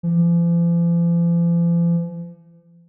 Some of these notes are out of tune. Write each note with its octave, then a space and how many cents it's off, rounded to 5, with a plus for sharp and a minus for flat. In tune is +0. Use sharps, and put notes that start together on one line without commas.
F3 -45